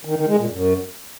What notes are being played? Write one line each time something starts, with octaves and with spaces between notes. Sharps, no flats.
D#3
D#3
G#3
A#2
F#2